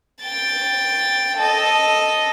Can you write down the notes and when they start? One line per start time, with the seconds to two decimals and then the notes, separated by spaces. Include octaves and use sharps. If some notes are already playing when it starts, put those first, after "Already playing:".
0.21 G5 A6
1.38 A4 D#5